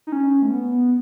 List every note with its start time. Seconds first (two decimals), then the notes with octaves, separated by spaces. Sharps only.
0.07 D#4
0.12 C#4
0.42 A3
0.50 B3